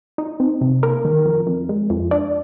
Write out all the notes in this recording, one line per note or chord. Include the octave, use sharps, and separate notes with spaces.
D#4
C4
C3
A#3 A#4
D#3
F2
F2
G#3
F2
D4 D5